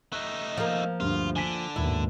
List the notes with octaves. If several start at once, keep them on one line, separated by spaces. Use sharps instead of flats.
A3 D#4 F#6
F3 A#3
D2 G2 F4
D3 G#5 B6
D#2 G#2 B2 E4